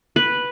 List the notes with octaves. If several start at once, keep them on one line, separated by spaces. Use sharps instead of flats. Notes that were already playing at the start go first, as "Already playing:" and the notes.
B4